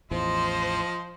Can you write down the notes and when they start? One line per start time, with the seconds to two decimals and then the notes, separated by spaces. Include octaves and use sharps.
0.11 A1 E2 A2 F3 C5 D#5